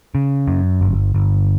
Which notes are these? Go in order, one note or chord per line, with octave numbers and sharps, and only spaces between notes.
C#3
F#2
G1
G1